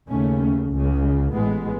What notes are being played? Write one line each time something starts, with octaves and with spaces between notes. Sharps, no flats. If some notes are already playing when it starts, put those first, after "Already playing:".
D#2 C#3 A3 C#4
C#2 C#3
A1 A2 G#3 B3